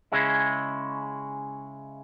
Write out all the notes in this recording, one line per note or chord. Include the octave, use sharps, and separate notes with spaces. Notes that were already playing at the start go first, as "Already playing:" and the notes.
C#3 G#3 C#4 E4